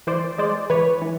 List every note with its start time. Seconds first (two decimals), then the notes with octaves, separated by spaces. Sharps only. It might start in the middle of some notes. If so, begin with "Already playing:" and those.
0.07 E3 C5 D5
0.38 G#3 C5 D5
0.70 E3 B4 C#5
1.02 E3